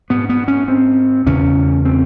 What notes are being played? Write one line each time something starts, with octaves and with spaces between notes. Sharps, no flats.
G#2 B3
B3
C#4
C4
E2 C#3 C#4
C4